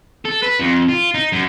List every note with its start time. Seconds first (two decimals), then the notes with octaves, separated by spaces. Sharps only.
0.25 A4
0.43 B4
0.59 F2
0.89 F4
1.14 D#4
1.33 F#2